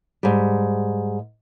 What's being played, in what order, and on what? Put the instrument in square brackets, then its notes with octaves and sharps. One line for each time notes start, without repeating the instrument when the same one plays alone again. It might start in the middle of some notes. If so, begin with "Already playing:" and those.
[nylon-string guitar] G#2 G3